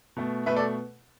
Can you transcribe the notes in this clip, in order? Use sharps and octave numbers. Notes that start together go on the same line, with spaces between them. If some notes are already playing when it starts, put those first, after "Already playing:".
B2 A3
B2 A3 B4 E5
A4 D5